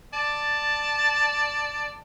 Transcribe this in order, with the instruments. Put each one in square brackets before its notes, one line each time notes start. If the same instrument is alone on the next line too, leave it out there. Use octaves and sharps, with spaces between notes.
[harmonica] D5 A5